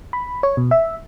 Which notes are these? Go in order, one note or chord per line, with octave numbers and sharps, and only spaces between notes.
B5
C#5
B2
E5